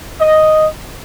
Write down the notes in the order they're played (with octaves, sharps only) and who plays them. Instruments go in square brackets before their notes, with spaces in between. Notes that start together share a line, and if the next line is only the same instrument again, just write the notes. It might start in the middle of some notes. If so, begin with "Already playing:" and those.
[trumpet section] D#5